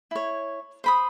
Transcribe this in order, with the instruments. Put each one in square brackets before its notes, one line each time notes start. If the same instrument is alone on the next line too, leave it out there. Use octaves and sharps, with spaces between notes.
[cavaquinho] E4 C#5
C5 B5 D#6